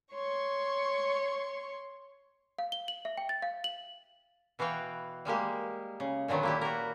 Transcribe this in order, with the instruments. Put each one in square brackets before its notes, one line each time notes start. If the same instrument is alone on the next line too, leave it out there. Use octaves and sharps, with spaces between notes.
[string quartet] C#5 C6 C#6
[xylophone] F5
G7
F#7
E5
G5
A6
F5
F#7
[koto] B2 E3 F#4 F5 G5
G3 G#3 A#3 G4
C#3
A#2 D3 D#3 F#3 B3
A#3 E4 G4
F#4 A#4